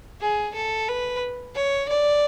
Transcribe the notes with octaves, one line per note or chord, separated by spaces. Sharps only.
G#4
A4
B4
C#5
D5